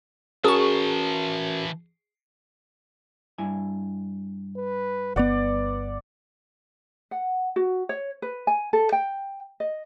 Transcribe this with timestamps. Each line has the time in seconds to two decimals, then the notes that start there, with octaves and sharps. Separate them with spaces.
0.44 E3 C#4 F#4 G#4 A#4 A5 C#6
3.38 G2 E4 G#5
4.57 B4
5.16 G1 B3 B4 D5 F#5
7.11 F#5
7.56 F#4
7.89 C#5
8.22 B4
8.47 G#5
8.73 A4
8.92 G5
9.60 D#5